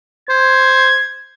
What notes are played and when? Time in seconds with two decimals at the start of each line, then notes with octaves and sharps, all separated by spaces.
0.29 C5 G#6